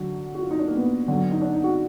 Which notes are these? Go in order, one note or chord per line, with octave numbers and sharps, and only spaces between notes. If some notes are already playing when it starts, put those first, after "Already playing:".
Already playing: D3 F#3 F#4
F#4
F4
D#4
D4
A#3
B3
D3 F#3
D#4
D4
D#4
F#4